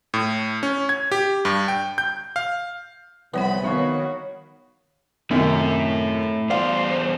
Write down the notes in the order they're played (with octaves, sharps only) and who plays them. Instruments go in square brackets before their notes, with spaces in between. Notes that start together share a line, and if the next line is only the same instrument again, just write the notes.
[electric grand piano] A2
C#4
G#6
G4
G2
G5
G6
F5
[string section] C2 C4 B5 [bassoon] E3 [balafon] F3 C#5 F#5 [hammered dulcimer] B3
[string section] D#3 F#4 [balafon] B3 D#4 [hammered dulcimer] C#5 F5 B5
[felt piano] F#2 C3 D#3 [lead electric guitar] A3 E4
[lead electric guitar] E2 C5 [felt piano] D5 F5